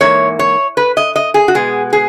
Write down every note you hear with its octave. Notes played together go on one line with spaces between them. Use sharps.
G#2 E3 A#3 C#5
C#5
B4
D#5
D#5
G#4
F#4
B2 G#3 B3 G#4
G#4